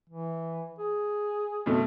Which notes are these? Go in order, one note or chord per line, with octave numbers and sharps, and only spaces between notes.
E3
G#4
F2 B2 A3